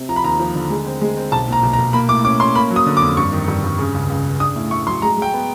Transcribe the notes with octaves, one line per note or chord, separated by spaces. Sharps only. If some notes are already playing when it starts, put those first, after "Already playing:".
Already playing: C3
F3 A#5
B5
D#2 A#5
F3
D3
G#3
C4
G#3
C4
B1 A5
A#2 A#5
B1
A#5
B1
A#3 B5
A2 D6
C#4 D6
C#4 C6
A#3 B5
F#3
D#6
D3
D6
F2
G2 C#6
D#3
G2
G2
C#3
C#2
C#2
C#3
D4 D#6
A2
A3 C#6
F#3 C6
G#3 A#5
G#3 G5
B3